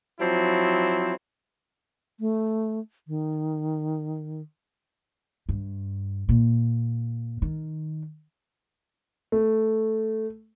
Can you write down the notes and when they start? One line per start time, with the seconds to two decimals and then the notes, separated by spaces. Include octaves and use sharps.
0.20 F3 F#3 C4 E4
2.20 A3
3.08 D#3
5.49 G2
6.29 A#2
7.42 D#3
9.32 A3